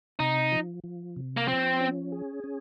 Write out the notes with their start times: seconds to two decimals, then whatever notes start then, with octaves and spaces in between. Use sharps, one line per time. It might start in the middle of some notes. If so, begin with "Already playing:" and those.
0.19 C3 D#4
0.52 F3
0.84 F3
1.16 C3
1.37 A#3
1.47 F3 C4
1.81 C#4
2.12 G#4
2.44 C#4